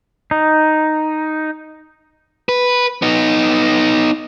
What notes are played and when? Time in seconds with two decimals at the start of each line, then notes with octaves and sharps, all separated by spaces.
0.31 D#4
2.49 B4
3.02 B3 D#4